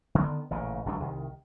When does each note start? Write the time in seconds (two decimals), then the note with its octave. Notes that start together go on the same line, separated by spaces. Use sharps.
0.15 D3 D#3 B3
0.51 A1 A#2 C#3
0.86 G1 C#2 F#3 D4
1.00 C2 D#3